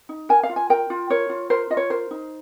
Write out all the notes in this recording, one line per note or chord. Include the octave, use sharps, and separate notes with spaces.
D#4
A#4 G#5
F5
F4
G#5
A#4 G5
F4
A#4 C#5
F4
A#4 C5
F4 D#5
C#5
A#4 C5
D#4